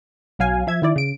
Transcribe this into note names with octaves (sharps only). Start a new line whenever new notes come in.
B1 F#3 F5 G#5
F3 E5 G#6
D#3 E4 D5
C#3 D7